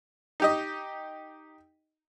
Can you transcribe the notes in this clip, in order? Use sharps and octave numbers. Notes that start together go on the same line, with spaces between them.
D#4 G4 D#5